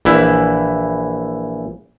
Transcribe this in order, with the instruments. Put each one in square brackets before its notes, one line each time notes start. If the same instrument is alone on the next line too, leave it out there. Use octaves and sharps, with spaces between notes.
[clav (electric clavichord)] A#1 E3 E4